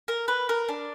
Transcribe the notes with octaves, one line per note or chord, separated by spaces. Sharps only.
A#4
B4
A#4
D4